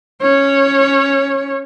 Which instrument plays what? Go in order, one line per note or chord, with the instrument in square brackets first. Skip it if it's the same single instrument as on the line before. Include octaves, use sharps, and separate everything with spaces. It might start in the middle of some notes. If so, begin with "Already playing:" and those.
[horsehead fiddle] C#4 C#5